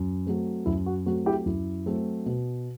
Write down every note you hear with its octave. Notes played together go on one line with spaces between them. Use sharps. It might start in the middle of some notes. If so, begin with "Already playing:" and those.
Already playing: F#2
F#3 A3 C4
F#2 E4
F#4
F#3 A3 C4 F#4
E4 G4
F#2 E4
F#3 A3 C4
B2